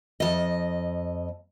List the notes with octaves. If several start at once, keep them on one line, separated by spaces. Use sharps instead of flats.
F2 D#5